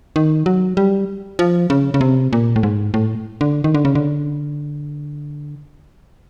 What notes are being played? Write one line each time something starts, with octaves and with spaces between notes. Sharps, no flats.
D#3
F#3
G3
F3
C#3
C#3
C3
A#2
A2
G#2
A2
D3
D#3
D3
C#3
D3